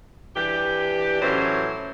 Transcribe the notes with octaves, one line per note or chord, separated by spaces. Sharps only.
E3 D4 G4
A2 E3 F#3 C#4 C5